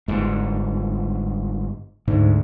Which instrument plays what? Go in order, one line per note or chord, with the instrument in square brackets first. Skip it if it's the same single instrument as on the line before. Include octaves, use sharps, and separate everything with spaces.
[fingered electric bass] G1 G#2
[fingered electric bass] D2 [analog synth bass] G#2